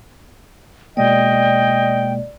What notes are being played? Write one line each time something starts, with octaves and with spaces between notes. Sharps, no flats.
B2 G#3 A#3 D5 D#5 G5